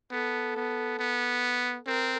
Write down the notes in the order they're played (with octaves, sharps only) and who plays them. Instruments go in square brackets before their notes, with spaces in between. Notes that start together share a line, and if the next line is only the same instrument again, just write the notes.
[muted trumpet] B3 [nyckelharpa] A4
[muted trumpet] B3
B3
[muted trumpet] C4 [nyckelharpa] A#4